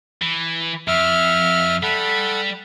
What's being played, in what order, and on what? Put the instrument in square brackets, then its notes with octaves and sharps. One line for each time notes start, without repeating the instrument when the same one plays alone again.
[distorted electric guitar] E3
[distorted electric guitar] F2 [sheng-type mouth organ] E5 F6
[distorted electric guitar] G3 [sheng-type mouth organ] A4 F#5 B5